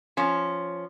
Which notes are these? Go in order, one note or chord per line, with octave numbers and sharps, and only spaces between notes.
F3 C#4